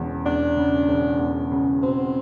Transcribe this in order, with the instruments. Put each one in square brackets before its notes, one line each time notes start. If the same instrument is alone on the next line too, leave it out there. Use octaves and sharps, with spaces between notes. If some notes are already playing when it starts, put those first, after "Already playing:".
Already playing: [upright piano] E1 E2 C#3
[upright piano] E2 [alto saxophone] D4
[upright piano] C#3
E1
E2
C#3
[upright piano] B2 [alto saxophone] C4